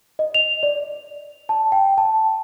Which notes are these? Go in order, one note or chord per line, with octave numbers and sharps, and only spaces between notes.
D#5
F7
D5
A5
G5
A5